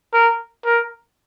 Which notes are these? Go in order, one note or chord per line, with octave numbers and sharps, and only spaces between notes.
A#4
A#4